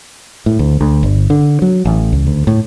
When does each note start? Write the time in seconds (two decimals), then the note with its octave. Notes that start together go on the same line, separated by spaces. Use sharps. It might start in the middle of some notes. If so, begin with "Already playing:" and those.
0.46 A2
0.59 D2
0.81 D2
1.03 G1
1.30 D3
1.62 F#3
1.85 A1
2.13 C#2
2.27 D2
2.47 A2